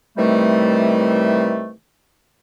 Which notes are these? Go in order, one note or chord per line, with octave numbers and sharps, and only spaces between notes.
C3 D#3 E3 G3 A3